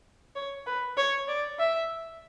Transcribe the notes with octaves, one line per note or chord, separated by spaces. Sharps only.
C#5
B4
C#5
D5
E5